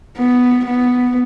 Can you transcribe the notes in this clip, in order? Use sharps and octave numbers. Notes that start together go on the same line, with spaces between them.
B3
B3